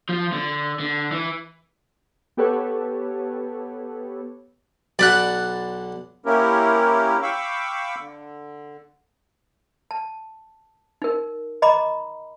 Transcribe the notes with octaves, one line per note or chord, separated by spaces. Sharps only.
F3
D3
D3
E3
B3 G4 A4 B4 C#5
B1 D4 D5 F#5 B5 F#6
A#3 C#4 E4 G4 A#4
F5 G5 B5 C#6 D6 E6
D3
A5
D#4 A#4
D#5 A#5 B5 D6